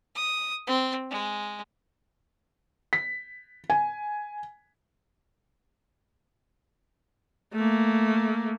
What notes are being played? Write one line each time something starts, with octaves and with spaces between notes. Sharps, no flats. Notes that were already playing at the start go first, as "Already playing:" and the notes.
D#6
C4
G#3
B6
G#5
A3 A#3